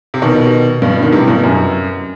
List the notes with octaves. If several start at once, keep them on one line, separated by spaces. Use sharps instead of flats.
C3
B2 D#3
G2 B2
D#3
A2 C3
G2 B2
F#2